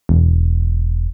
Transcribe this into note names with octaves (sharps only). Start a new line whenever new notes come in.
E1